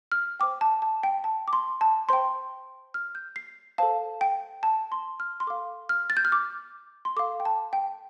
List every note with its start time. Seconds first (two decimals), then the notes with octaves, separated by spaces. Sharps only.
0.12 F6
0.40 C5 G5 D6
0.61 A5
0.82 A5
1.03 G5
1.24 A5
1.48 D6
1.53 C6
1.81 A5
2.09 C5 G5 C6
2.94 F6
3.15 G6
3.36 C7
3.78 A4 C5 F5 A5
4.21 G5
4.63 A5
4.92 C6
5.20 F6
5.40 C6
5.47 A4 F5 D6
5.89 F6
6.10 A6
6.17 G6
6.25 F6
6.32 D6
7.05 C6
7.16 A4 F5 D6
7.40 G5
7.45 A5
7.73 G5